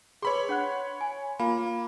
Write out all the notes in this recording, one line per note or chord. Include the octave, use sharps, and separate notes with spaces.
G#4 B4 C#5 B5 C6
D4 F#5 F#6
G#5
A#3 F4 F5 B5